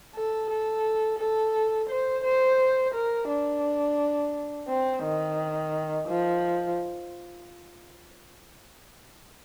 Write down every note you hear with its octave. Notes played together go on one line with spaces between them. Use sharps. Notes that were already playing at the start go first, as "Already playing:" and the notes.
A4
A4
A4
C5
C5
A#4
D4
C4
D#3
F3